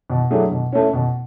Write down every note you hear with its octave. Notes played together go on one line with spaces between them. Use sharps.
B2
F#3 A3 D4 G#4
B2
A3 C#4
B2